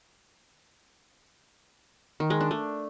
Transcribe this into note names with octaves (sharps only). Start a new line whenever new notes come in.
D#3
G#3
D4
A3